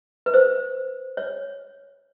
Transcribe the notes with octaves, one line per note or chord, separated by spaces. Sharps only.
B4
C5
C#5